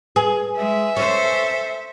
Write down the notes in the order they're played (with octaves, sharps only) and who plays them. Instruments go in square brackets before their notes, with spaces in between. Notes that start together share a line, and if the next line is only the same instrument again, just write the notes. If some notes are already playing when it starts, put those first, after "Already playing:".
[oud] G#4 [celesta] B4 G#5
[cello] G#3 [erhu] E5
[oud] C#4 [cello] A4 C5